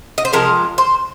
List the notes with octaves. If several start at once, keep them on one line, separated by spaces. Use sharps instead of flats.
D#5
C5
C3 F3 G#3 A#4
C5